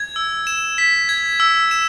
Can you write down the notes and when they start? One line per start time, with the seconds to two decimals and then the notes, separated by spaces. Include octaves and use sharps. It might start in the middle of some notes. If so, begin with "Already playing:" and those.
Already playing: G#6
0.16 E6
0.47 E7
0.78 B6
1.09 G#6
1.40 E6
1.71 E7